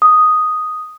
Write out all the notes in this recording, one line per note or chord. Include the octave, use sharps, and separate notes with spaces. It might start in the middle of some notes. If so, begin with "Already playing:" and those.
D#6